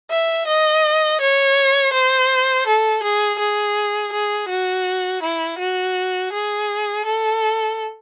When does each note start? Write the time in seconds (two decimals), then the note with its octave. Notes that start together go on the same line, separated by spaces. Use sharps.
0.11 E5
0.47 D#5
1.20 C#5
1.93 C5
2.66 A4
3.03 G#4
3.39 G#4
4.13 G#4
4.49 F#4
5.22 E4
5.58 F#4
6.32 G#4
7.05 A4